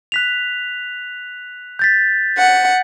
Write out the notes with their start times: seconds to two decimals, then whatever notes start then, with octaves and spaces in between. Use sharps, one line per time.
0.12 F#6 B6 F7
1.79 G6 A6 B6
2.38 F#5